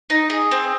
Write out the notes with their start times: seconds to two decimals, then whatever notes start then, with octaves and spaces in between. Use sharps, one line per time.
0.10 D#4
0.30 G#4
0.51 C4